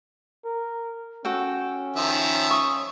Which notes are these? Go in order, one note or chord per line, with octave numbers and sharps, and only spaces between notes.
A#4
C#4 F#4 A4 G5
D#3 F3 E5
C#6 D#6